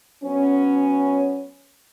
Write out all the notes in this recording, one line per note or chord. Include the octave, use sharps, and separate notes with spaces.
F#3 B3 C#4